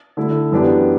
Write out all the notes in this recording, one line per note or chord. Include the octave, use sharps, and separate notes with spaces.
D3 A3 E4
F#2 E3 B3 D4 G4